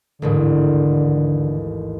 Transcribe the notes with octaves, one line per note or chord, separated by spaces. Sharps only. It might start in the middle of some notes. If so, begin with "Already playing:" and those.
A1 D#2 G#2 D3